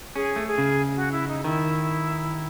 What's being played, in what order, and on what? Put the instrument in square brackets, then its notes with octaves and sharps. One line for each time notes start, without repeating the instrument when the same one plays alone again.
[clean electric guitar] C#4 [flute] G#4
[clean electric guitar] A3
[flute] G#4
[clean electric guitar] C#3
[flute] F#4
E4
D#4
[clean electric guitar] D#3 [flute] E4